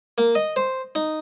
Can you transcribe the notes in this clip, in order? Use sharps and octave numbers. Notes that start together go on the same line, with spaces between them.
A#3
D#5
C5
D#4